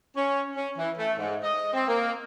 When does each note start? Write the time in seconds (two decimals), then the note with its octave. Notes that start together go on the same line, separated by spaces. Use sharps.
0.16 C#4
0.55 C#4
0.77 E3
0.97 A3
1.18 G#2
1.43 D#5
1.73 C4
1.88 A#3